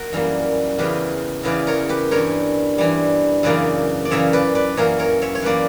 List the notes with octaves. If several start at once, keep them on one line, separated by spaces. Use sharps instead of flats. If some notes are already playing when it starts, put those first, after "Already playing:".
Already playing: F#4 A#4
F#2 E3 G3 A#3
E2 C#3 E3 G4 B4
E2 C#3 E3 B4 D5
A#4 C#5
G4 B4
G2 E3 G3 A#4 C#5
G2 E3 G3
F#2 C#3 E3 A#3 B4 D5
D5
F#2 C#3 E3 A#3 C#5 E5
B4 D5
B4 D5
F#2 E3 A#3 A#4 C#5
A#4 C#5
C#5 E5
C#5
F#2 E3 A#3 B4 D5